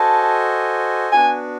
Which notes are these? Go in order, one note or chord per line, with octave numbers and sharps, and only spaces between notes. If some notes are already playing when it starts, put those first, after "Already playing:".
Already playing: F#4 A4 C5 D#5 G#5 A5
B3 D4 F#4 G#5